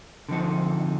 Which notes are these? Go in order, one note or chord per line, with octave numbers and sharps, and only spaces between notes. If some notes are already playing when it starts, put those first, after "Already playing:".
D3 F3 C4 D#4